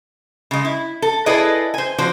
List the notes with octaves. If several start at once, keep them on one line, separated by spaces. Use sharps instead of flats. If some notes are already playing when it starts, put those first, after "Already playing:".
C#3 G#3
E4
A4
E4 G#4 A4 B4 D5 D#5
C5 G#5
F3 C4 F#4 C5 D5